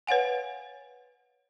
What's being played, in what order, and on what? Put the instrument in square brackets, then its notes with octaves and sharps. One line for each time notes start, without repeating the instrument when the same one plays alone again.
[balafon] B4 C#5 F5 F#5 G#5